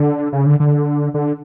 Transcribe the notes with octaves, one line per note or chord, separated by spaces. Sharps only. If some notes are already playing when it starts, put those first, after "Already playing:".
Already playing: D3
C#3
D3
D3
D3